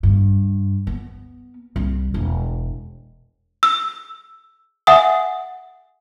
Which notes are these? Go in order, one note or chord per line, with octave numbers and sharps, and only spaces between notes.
G2
B3
C2
E1
E6
E5 F#5 G#5 D#6